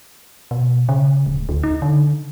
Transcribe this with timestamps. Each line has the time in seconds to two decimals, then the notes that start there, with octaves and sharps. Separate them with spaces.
0.51 B2
0.89 C#3
1.26 D1
1.49 D2
1.63 D#4
1.82 D3